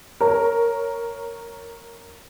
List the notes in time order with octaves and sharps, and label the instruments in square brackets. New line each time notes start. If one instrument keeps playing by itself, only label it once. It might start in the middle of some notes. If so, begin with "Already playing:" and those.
[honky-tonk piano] A#4 C#5